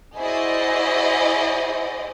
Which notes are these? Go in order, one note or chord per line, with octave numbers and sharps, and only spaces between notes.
E4 F#4 G#4 C5 D5 D#5